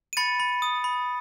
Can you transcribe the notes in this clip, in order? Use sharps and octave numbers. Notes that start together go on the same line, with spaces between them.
D#7
B5 A6 C#7
B5
D#6
B5